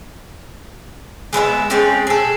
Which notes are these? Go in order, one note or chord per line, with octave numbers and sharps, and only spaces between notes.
G#3 B3 C5 E5
G#3 A3 C4 C#4
G#4 A4